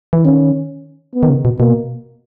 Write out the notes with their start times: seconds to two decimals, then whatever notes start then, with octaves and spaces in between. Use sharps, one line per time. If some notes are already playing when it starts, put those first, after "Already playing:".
0.13 E3
0.24 D#3 C#4
1.15 B3
1.23 D#3
1.30 C#3
1.45 B2
1.59 B2 A#3